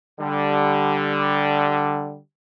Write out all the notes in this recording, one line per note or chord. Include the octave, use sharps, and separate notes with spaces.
D3 G3